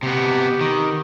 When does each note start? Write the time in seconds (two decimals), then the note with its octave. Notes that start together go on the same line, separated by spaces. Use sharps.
0.03 C3 B3 G4
0.61 D#3